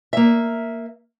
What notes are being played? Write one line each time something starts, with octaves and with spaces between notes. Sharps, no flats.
A#3 E5